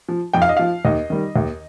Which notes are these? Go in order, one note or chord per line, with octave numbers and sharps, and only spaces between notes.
F3
F2 G5
F5
D#5
F3 F5
D#2 D#5
D#3 G3
D#2